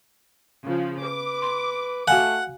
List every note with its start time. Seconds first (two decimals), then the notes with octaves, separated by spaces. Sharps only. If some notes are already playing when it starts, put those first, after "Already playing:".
0.64 C#3 F3
1.03 B4 D6
1.42 C6
2.08 A3 F#4 F5 F#5 G#5